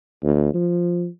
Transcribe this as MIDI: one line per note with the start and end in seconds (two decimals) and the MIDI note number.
0.23 0.53 38
0.54 1.07 53